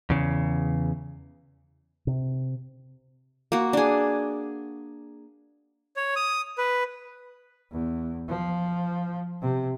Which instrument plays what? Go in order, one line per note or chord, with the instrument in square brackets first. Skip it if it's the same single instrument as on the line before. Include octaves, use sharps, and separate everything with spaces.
[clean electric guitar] E2 C#3
[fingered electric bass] C3
[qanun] A#3 F#4
D4 G#4
[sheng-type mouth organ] C#5
D#6
B4
[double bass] E2
F3
C3